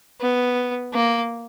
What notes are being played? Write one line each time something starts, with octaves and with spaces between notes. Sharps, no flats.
B3
A#3